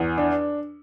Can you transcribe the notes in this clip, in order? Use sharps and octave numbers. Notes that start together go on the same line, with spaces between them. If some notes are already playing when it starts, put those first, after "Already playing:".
Already playing: E2
D4